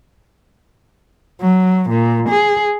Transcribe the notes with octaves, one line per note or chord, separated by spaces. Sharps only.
F#3
A#2
G#4